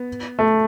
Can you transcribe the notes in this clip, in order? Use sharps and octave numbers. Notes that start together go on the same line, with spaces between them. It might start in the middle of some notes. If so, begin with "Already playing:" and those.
Already playing: B3
A3